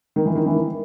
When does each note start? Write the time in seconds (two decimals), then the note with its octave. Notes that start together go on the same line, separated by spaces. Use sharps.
0.16 D#3
0.26 E3
0.35 D#3
0.46 E3
0.56 D#3